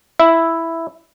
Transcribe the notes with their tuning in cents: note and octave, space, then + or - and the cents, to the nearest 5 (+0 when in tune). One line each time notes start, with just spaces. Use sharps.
E4 +0 E5 +0